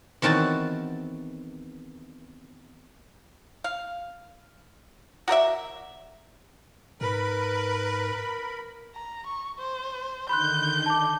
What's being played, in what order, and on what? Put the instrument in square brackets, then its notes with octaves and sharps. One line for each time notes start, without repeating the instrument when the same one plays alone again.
[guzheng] E2 D#3 C4 F#4 A5
[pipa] F5
F#4 A#4 D5 E5
[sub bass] G#2 [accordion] A#4 B5 [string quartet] B4
[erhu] A#5
C#6
C5
[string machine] D3 D#3 [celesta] B5 C6 F#6 [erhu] G6
[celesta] A5 D6